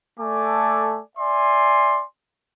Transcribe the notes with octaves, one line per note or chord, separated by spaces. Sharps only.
A3 A4 D5 G#5 D6
D5 E5 G#5 C6